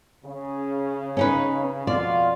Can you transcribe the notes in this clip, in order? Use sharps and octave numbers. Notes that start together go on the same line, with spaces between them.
C#3
C#4 D#4 B4
F2 B2 F4 D5 F5